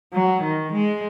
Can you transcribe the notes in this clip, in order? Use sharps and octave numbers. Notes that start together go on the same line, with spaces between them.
F#3
D#3
G#3